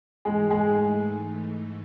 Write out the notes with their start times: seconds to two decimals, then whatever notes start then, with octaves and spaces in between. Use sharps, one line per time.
0.25 G#2 E3 G#3 A3 D#4 G#4
0.50 G#3 G#4